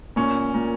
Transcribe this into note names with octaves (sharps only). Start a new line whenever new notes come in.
A#2 C#4
A#2